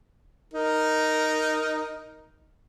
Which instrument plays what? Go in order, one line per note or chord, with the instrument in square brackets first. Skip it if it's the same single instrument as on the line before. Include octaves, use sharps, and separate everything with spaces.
[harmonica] D#4 A#4